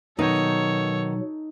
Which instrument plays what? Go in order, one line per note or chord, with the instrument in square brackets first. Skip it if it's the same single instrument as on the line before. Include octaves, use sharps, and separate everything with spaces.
[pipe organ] B2 F#3 [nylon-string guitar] D#3 B3 [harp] D#4 [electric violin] A4 C#5